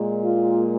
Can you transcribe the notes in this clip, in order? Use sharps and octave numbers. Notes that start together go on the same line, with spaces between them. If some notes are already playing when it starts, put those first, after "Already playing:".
Already playing: A#2 G#3
F4